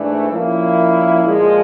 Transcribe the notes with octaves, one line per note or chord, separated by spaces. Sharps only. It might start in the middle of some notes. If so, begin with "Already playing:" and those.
Already playing: G#2 E3 A3 D4
A#2 F3 A#3 C#4 E4
A#2 F3 G#3